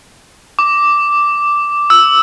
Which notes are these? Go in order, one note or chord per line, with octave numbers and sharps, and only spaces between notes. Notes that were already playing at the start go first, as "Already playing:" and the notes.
D6
E6